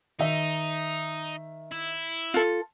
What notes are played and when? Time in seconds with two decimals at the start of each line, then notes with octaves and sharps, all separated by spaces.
0.19 D#3 D#4 E5
1.72 E4
2.34 F4 A4